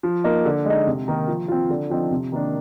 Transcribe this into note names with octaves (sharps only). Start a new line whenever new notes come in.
F3
A#3 D#4
D3
G#3 D#4
C3
D#3 A#3
F3
C4 F4
D3
F3 C4 D#4
C3
D#3 A#3 D4